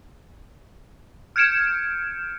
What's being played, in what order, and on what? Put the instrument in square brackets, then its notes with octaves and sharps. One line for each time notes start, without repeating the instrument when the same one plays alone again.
[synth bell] F6 G6 G#6 C#7 D7 E7